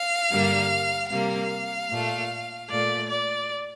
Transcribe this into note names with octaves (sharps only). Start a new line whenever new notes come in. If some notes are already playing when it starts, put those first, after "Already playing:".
Already playing: F5
G2 D3 G3 A#3
C3 G3 A#3 F5
A#2 A3
A#2 A3 D5
D5